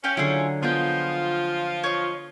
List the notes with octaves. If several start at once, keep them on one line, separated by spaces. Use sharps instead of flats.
C#4 G4 F5
D3 F#3 E4 F4 G#4
F3 B3 F4 G#4 D#5 G5
C#5 D#5